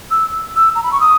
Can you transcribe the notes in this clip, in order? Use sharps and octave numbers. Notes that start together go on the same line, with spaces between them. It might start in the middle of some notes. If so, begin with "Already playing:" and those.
E6
E6
A#5
B5
C#6
D#6